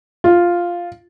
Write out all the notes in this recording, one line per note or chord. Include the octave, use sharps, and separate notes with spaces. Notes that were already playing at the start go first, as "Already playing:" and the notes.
F4